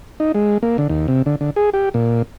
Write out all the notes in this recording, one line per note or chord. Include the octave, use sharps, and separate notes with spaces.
D#4
G#3
A#3
D3
D#2
C3
D3
D3
G#4
G4
A#2